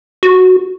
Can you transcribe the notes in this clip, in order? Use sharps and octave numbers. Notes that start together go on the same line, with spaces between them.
F#4